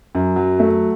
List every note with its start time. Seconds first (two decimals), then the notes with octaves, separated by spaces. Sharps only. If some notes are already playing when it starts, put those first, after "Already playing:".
0.15 F#2
0.36 F#3
0.59 A3